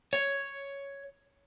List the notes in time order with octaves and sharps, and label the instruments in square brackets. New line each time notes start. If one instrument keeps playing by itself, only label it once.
[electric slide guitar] C#5